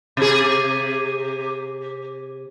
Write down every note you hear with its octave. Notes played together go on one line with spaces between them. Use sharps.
C3 G#4